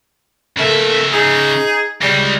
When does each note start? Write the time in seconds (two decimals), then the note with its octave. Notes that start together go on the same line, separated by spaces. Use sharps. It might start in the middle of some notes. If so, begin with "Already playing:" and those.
0.58 C#3 A3 A#3 E5
1.12 D#4 G#4
2.01 C#3 G3 G#3